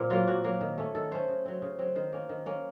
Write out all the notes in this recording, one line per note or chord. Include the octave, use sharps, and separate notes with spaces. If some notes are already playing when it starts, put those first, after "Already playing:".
Already playing: A#2 C4 A#4
F#3 A#3 F4
A#2 F#4
F#3 A#3
D#3
A3 C#4
D#3 A4
A3 C#4 C5
C#3
F#3 C4
C#3
F#3 C4
D#3 C5
A#3 C#4
D#3
A#3 C#4